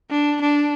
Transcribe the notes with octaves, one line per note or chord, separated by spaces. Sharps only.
D4
D4